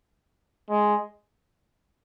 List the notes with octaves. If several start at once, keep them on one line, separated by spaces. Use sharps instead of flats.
G#3